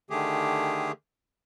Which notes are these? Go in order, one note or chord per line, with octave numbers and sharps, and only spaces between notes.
D3 D#3 A3 G4 G#4